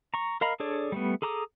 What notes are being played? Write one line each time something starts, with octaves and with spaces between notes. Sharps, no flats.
A#5 C#6
A#4 D#5 F5 A#5 B5
D4 G#4 A4 C#5 D5
G3 A3 B3
G#4 A4 A#5 D6 D#6